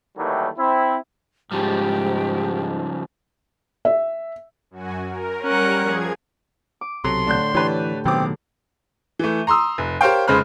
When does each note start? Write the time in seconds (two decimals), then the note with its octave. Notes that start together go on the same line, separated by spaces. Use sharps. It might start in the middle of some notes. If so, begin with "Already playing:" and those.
0.17 D#2 D#3 E3 F#3 G3 A3
0.58 C4 E4
1.52 G#2 C#3 F3 G3 G4
3.85 E5
4.71 F#2 F#4 G#5
5.07 A#4
5.42 G3 C#4 A#4 F#5
5.76 F3 G#4 G#6
6.81 D6
7.04 B1 C3 F#3 A4 C6
7.27 A2 D3 D4 F#6 G6
7.55 E3 D4 G4 A4 B4 C#5
8.05 E1 B2 D#3 F#3 B3 C4 D6
9.19 E3 A3
9.47 A#5 C6 D#6 E6
9.78 F1
10.01 G4 A#4 C5 C#5 F5 G5
10.28 F1 C#3 G#3 C5 B5 F6